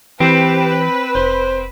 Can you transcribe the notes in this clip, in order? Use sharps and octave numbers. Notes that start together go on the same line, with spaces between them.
E3 C4 G4 B4
F1 C5